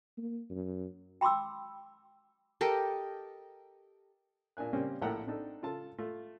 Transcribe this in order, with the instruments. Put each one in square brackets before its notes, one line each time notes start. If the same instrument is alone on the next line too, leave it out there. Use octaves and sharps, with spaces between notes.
[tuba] A#3
F#2
[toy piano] G5 B5 C6 D6 E6
[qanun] G4 A4 A#4 D#5
[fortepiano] A#2 D4 G#5 F#6
C#3 G3 A#3 C4 C#4
A#1 A2 A4 F#5 G5 A#5
C4 D4 D#4 A4
C#3 F4 A4 A5
A3 F4